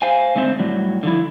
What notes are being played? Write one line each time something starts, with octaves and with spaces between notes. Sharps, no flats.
C5 F5 G#5
D3 G#3 A3 C4 C5
A2 F#3 G3
D3 F3 E4